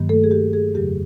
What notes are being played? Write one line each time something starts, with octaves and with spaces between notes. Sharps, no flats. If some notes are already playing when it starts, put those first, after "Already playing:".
Already playing: G2 D#3 F#3 A#3
A3 A4
G#4
G4
G#4
F2 C#3 F#3 G4